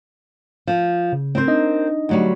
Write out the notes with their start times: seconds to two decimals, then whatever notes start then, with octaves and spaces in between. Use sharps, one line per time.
0.67 F3
1.13 C#3
1.35 C4 A#4 C5
1.48 D4 D#4 D#5
2.09 D2 F#3 G3